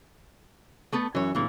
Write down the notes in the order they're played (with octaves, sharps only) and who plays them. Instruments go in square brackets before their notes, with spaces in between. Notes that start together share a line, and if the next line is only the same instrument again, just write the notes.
[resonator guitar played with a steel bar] A3 B3 A4
[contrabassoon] F#2 [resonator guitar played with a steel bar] E3 C#5
[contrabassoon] D1 [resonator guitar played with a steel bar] A#2 E3